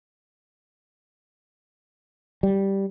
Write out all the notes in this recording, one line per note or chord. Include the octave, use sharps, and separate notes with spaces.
G3